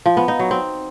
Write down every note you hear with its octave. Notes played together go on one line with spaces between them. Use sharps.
F3
B3
D#4
F#3
C4